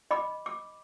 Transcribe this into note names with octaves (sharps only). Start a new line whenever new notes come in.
D#5 B5 D6
D6